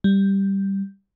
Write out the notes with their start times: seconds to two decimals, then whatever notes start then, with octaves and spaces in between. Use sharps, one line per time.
0.04 G3